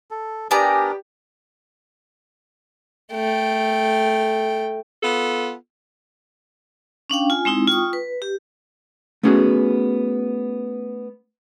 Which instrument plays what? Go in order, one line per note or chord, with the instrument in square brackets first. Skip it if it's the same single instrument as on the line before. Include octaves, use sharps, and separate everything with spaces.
[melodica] A4
[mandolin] B3 D5 A#5 [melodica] D4 A#4 [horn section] G4 [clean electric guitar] G#5
[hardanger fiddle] A3 G5
[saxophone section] B3 F4 A4
[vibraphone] C#4 D4 F5 G5
F4 G#5
G#3 C4 D#4 E4
F4 G5 C#6 D#6
B4
G4
[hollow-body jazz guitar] A3 B3 C#4 F#4 G#4